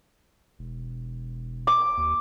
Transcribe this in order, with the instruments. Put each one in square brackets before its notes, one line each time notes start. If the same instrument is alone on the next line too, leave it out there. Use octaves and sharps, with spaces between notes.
[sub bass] E1
[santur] D6
[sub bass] D#2